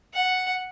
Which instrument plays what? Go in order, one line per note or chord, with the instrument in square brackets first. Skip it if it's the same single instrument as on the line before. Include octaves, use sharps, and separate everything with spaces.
[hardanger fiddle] F#5